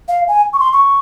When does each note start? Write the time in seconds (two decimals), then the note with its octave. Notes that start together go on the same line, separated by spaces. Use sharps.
0.08 F5
0.28 G#5
0.53 C#6
0.59 C6
0.73 C#6